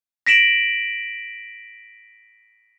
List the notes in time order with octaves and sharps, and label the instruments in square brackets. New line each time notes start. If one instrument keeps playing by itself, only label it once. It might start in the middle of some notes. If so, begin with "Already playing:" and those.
[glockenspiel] A#6 B6 D7 E7 F#7